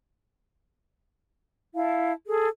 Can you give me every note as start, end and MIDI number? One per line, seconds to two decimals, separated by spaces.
1.75 2.13 64
1.75 2.13 77
1.75 2.13 81
2.28 2.48 68
2.28 2.48 69